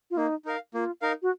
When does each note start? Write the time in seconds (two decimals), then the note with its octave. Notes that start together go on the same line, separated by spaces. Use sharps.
0.11 F4
0.17 A#3 D#4
0.45 D#4 A#4 F5
0.74 A#3 F4
1.02 D#4 A#4 F5
1.22 F#4